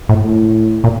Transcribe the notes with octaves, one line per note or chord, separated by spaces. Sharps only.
A2
A2
A#2